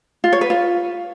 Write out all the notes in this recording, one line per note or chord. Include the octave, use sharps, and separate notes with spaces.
F4
C#5
B4
F4